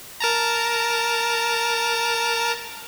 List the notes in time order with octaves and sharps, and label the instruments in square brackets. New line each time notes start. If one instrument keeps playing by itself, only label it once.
[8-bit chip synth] A#4 A5 A#5